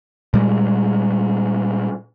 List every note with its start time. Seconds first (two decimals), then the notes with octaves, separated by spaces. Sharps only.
0.34 A#2 G3 G#3